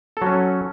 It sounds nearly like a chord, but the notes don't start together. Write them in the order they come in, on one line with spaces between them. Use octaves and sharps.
A4 F#3 C#4